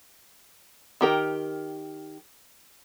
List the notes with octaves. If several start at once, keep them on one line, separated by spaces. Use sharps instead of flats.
D#3 G4 A#4